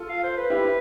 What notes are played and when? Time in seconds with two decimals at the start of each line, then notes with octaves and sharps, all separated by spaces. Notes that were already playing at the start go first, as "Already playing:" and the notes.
Already playing: F4 A4
0.09 F5
0.23 C5
0.37 B4
0.50 E4 G4